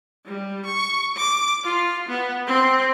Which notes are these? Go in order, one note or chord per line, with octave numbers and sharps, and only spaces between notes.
G3
C#6
D6
F4
B3
C4